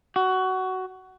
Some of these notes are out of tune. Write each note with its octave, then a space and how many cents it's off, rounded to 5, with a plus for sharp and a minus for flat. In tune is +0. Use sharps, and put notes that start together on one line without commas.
F#4 +15